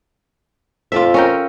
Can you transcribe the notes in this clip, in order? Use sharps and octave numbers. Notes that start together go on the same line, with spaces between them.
F2 F4 D5 E5
C#4 A#4 G5